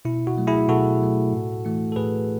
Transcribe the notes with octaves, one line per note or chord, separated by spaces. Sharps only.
B2 E4
F#4
F#3 A3
E4 G#4
B2 F#4 A4
F#3 A3
A2
E3 A3 E4
A4
A2 G#4 B4